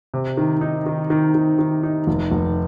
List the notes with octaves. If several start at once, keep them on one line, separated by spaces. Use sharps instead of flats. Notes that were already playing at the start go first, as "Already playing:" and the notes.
C3
D#3
D#4
D#3
D#3
D#3
D#3
D#4
F1
F1